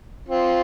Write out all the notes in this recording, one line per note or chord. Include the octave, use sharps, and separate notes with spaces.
C4 F4